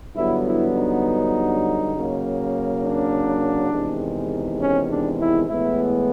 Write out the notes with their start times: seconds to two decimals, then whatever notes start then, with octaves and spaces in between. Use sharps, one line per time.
0.15 G2 D3 F#3 B3 E4
0.44 E4
0.75 D#4
1.93 C#3 F#3 A#3
2.82 D4
3.71 E2 C3 D#3 G#3
4.60 C#4
4.90 D4
5.19 E4
5.48 A2 E3 G#3 B3 E4